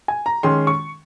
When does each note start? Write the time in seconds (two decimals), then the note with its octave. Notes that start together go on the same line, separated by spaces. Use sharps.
0.08 G#5
0.26 A#5
0.43 D#3 G#3 C#4 C6
0.67 C#6